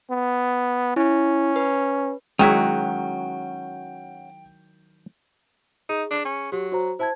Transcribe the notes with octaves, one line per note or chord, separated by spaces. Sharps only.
B3
C#4 E4
B4
D#3 F#3 G#3 C#4 E4 F#4 G5
D#4 G#4
D4
C#4
F#3 G4
F#4 C5 A#5
E4 C5 A5 G#6